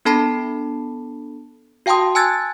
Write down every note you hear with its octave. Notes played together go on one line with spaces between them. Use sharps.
B3 D4 A4 A5 B5 C7
F#4 F5 G5 A5 C6 D#6
G#5 A5 E6 F#6 G#6 A6